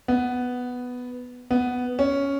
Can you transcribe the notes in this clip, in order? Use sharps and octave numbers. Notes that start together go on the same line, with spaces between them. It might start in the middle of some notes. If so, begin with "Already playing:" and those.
B3
B3
C#4